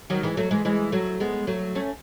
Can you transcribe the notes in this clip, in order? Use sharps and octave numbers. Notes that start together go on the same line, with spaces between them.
D#3 F#3
E3 G#3
F#3 A3
E3 G#3
E3 G#3
F#3 A3
G#3 B3
F#3 A3
A3 C#4